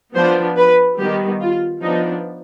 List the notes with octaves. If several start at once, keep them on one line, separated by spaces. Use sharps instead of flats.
F3 B3 D4 C5
B4
D#3 G3 B3 G4
F4
F3 B3 D4 D#4